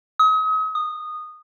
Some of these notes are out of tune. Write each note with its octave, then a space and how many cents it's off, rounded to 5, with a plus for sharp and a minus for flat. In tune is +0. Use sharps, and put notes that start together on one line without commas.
D#6 +40
D#6 -15